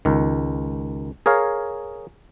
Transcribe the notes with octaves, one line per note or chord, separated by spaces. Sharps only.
C#2 D#3
G#4 A#4 C#5 F5